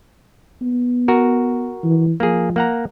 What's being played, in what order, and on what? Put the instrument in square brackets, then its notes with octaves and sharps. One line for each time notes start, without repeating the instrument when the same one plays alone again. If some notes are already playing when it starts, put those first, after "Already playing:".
[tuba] B3
[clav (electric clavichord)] F#4 A#4
[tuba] E3
[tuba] F3 [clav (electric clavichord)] A#3 G#4
[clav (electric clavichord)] A#3 F#5 A#5